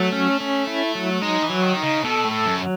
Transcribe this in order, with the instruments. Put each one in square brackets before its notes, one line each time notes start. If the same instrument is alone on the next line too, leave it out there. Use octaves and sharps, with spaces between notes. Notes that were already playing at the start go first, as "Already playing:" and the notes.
Already playing: [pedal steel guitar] F#3 [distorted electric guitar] A3
[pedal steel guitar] C#4
C#4
E4
F#3
[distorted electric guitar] G#3 [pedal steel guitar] D#4
[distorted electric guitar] E3
[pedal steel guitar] F#3
[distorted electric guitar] D#3
[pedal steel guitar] D#4
[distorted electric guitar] C#3
[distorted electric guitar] B2 [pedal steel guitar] A4
[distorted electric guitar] A2
[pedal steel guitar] A4
[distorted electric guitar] F#2
[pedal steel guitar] F#3